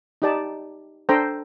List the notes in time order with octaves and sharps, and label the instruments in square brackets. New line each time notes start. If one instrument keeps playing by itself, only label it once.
[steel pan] D#4 G4 D5 A5
D4 A4 C5 G5 A#5